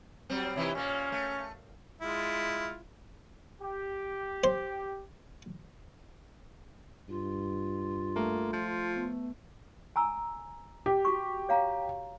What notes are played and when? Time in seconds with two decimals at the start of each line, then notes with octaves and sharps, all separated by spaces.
0.30 F#3 G3 C4
0.56 C3 E3 D#4 E4
0.75 A#2 A#3 C#4
1.12 A3
2.01 G#3 E4 F4
3.62 G4
4.44 C5
7.09 G2 F4
8.16 A3 A#3
8.53 F3
8.97 B3
9.96 G#5 A#5 E6
10.86 G4
11.05 F#4 C#6
11.49 C#5 F5 A#5